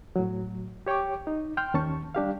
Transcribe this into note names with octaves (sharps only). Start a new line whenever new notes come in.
A2 F#3
G4 C#5 G5 C#6 D6
D#4
G5 C6 F6 G6
D#2 C#4 A5 C#6
G3 D4 G4 F5